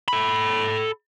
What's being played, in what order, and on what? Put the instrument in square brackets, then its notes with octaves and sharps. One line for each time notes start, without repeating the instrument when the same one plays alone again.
[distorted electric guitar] A4 B5